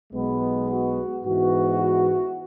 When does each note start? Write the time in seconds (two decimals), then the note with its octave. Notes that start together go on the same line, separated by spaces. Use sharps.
0.13 B1 B2 G#3 B3
0.69 F#4
1.25 G#2 E3 B3 F#4